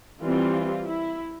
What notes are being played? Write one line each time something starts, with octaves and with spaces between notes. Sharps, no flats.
E3 G3 C4 F4
E4